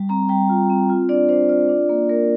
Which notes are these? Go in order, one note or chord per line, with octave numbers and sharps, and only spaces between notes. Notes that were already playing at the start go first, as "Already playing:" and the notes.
Already playing: G3
C4 A#5
G3 G5
F4
C4
F4
D4 D5
D4 C5
F4 D5
D4
A#3
A#3 A#4